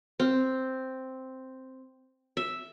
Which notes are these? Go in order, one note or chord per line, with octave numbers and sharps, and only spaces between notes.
C4
E5